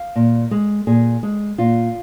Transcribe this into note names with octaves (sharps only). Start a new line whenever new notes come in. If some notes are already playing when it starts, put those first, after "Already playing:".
Already playing: F5
A#2
G#3
A#2 G#4
G#3
A#2 F4